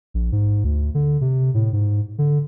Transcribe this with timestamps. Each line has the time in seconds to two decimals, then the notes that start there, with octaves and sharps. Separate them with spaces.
0.14 A#1
0.32 G#2
0.64 D2
0.94 D3
1.21 C3
1.54 A2
1.73 G#2
2.18 D3